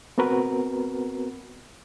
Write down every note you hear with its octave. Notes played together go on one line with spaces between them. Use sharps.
B3 C4 F#4 A#4 B4